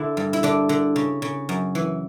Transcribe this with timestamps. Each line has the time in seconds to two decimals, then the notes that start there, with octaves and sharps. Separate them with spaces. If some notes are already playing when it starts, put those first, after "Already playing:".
Already playing: D3 E4
0.17 G2
0.33 E4
0.43 D3 D4
0.69 D3
0.96 C#3
1.22 C#3
1.49 F#2
1.75 E3